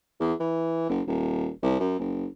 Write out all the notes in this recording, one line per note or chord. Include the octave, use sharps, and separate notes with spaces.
E2
E3
F#1
D#1
C2
F#2
F#1